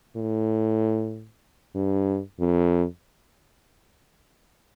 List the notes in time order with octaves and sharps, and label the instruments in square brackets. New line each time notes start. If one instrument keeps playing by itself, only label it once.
[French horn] A2
G2
F2